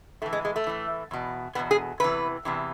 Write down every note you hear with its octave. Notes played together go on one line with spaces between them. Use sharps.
A2 E3 A3
G#3
G#3
A3
A2 E3
E2 B2
E2 B2 B3
G#4
E2 C3 E3 B4
E2 C3 E3